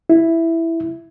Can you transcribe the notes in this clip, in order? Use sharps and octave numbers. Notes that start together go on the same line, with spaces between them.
E4